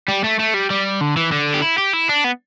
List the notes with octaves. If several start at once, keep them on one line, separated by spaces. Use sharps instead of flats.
G3
A3
A3
G3
G3
D3
E3
D3
G4
E4
G4
E4
D4
B3